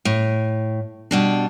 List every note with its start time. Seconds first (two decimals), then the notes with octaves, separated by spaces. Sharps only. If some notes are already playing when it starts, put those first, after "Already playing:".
0.05 A2
1.11 B2 G3 D4